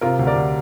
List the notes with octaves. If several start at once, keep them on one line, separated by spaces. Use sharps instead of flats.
C3 F4 A#4
D2
A#4 D5
D2